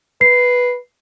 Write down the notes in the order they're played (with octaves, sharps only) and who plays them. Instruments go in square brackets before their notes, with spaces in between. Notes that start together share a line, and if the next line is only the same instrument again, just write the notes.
[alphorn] B4 [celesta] C7